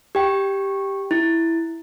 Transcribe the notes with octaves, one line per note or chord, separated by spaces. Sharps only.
G4 G5
E4